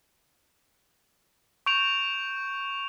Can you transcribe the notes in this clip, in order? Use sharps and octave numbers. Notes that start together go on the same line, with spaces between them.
C#6 G6 D7 F7